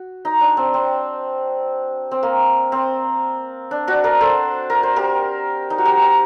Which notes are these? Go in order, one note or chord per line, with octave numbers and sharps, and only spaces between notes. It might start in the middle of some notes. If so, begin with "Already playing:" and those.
Already playing: F#4
D#4
D4
C4
C4
C4
A#3
C4
D4
D4 F#4
A#4 D5
A4 C5
A#4
C5
G4 A#4
D#4
F#4
D#4 G4
D#4